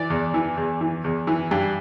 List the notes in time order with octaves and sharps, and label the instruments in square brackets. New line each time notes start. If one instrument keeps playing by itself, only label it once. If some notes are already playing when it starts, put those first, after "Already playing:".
Already playing: [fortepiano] E3 D5
E2
E3
E2
E3
E2
E3
G2